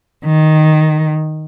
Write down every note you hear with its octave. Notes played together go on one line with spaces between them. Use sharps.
D#3